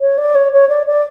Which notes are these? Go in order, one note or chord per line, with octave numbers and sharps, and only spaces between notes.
C#5
D5
C#5
C#5
D5
D5